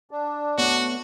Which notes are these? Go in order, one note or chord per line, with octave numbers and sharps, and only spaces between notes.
D4
A3 B3 F#4 C#5